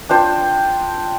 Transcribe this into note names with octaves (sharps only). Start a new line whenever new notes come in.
D4 F4 C5 G5